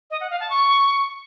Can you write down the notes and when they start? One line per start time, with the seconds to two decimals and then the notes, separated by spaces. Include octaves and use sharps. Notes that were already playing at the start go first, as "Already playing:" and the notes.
0.11 D#5
0.20 F#5
0.30 F5
0.40 A5
0.50 C#6